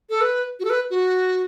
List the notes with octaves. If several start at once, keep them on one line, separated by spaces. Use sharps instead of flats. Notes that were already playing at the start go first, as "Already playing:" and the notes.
A4
B4
F#4
A4
B4
F#4